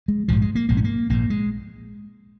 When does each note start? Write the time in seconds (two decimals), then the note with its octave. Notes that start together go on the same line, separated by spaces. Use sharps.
0.08 G#3
0.28 A#1 G#2 F3
0.42 G#3
0.55 A#3
0.69 A#1 G#2 A#3
0.77 C#4
0.84 A#3
1.09 A#1 G#2 A#3
1.30 G#3